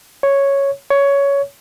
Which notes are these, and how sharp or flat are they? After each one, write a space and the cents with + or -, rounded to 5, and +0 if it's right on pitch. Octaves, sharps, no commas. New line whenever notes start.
C#5 +0
C#5 +15